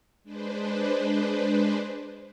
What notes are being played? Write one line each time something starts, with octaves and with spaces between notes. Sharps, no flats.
G#3 D4 B4 C5